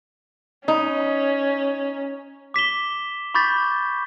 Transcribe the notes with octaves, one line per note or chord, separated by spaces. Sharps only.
C#4 D#4
D6 B6 E7 G7
B5 C#6 D6 G6 A6 B6